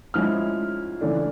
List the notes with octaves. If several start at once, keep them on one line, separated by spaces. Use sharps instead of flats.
G#2 F3 G#3 C#4 E4 F6
C#3 E3 A3 D4